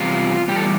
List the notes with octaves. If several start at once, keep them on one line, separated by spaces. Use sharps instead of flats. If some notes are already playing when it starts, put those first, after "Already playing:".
Already playing: E2 C3 G3 F4
E2 C3 G3 G4 A4